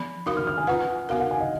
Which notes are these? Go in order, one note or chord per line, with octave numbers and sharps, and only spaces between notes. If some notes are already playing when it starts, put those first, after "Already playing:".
Already playing: F3 B3 B5
D#4 F#4 A#4 F5 D#6
F6
F6
G#5
C#4 F4 B4 F#5
B3 F#4 A#4 F5
F#5
G#5
D#5